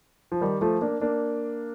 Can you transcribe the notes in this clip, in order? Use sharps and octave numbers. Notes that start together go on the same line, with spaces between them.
F3
D#3 G3
F3 A3
A#3 D4
A#3 D4